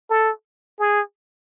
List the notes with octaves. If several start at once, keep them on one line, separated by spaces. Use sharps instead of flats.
A4
G#4